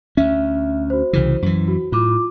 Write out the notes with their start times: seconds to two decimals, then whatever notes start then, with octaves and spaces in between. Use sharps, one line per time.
0.17 D2 C#4 E5
0.90 F#4 C5
1.13 C2 C#3 E3
1.42 F#2 E3
1.68 F#4
1.92 A2 F4 D6